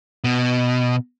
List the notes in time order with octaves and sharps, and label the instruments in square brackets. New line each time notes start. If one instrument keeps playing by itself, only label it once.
[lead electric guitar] B2